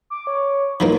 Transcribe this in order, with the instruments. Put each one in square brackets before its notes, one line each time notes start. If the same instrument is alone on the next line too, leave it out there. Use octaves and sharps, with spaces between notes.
[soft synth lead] D6
C#5
[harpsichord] E3 F3 A#3 [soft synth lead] D#4